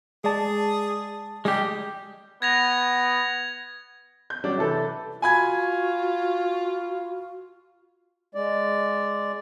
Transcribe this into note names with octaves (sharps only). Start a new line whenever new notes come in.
G#3 G#4 D5 A5
G3 G#3 G4
B3 G#6 A#6 F7
G6
F#3 G3 C#4 D4
C3 E3 A4 B4
F4 F#4 G#5 B5 G#6
G#3 D5